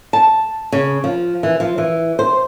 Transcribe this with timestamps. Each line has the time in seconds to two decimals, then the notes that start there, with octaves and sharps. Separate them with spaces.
0.13 A5
0.72 C#3
1.04 F3
1.43 E3
1.60 F3
1.78 E3
2.19 C5